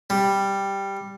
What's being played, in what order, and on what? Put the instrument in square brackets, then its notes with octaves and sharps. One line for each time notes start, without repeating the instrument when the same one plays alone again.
[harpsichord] G3